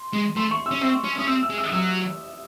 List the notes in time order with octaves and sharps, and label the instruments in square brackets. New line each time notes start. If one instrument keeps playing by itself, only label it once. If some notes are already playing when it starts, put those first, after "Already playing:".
Already playing: [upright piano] C6
[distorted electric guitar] G#3
[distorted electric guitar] A3 [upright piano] C6
[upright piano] C#6
E6
[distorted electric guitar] C#4
[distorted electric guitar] C4 [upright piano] E6
[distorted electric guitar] C#4
[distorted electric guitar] C#4 [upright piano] D#6
[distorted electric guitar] C4 [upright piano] E6
[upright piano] E6
[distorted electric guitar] G#3
[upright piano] E6
D#6
[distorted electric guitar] F#3 [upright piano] E6